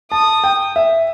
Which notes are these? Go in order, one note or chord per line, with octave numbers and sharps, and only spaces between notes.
A5 D#6
G5
E5